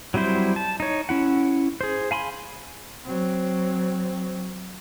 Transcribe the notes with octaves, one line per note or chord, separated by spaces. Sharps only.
F#3 G3 C4 E4 C5
A5
D#4 C#5
C#4 E4 F#5
G#4 C5
F5 G#5 B5 C6
F#3 C4